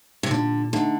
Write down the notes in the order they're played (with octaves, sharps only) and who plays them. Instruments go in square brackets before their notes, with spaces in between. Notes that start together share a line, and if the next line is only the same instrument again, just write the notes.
[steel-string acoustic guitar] C3
[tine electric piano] A#2 [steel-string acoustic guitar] D3
[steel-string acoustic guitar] D3 [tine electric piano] A3 D#4